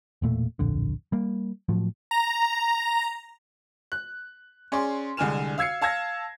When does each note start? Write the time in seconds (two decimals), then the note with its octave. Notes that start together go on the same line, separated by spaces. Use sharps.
0.22 E1 A#2 A3
0.59 D1 A#1 F2 D3
1.12 G3 A#3
1.69 A2 F3 F#3
2.11 A#5
3.92 F#6
4.72 C#4 G#4 D5 C6
5.17 C2 D3 G#3 G#5 F6 E7
5.58 F5 E6 G#6 C7 C#7
5.82 F5 A5 E6 G#6 A#6